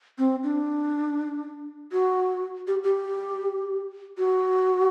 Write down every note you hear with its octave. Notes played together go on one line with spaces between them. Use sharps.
C4
D4
F#4
G4
G4
F#4